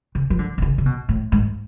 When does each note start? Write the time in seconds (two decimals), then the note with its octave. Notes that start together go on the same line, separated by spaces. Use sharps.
0.15 C#3
0.30 F3
0.39 D3
0.58 B2
0.62 C#3
0.78 C#3
0.86 B2
1.09 A2
1.32 G#2